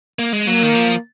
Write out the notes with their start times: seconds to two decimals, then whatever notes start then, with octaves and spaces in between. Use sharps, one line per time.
0.19 A#3
0.33 G#3
0.47 F#3 A#3
0.63 D#3
0.75 F3